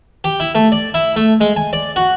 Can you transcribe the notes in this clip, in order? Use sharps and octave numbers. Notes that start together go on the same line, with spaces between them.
G4
E4
A3
D5
E4
A3
G#3
G#5
D5
F#4